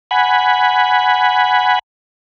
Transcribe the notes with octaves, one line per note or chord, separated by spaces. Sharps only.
F#5 G#5 B5